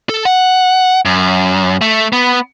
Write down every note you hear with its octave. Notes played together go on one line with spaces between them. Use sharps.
A4
F#5
F#2
A3
B3